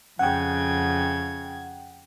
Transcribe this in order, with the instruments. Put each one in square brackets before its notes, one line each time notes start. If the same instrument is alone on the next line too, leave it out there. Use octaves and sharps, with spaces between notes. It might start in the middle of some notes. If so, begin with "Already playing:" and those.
[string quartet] F2 C#3 G#6 [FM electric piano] F#5 G5